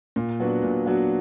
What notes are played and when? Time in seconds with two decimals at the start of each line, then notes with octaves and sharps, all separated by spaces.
0.16 A#2
0.39 F#3 B3 D4 F#4
0.63 A#2
0.86 F#3 B3 D4 F#4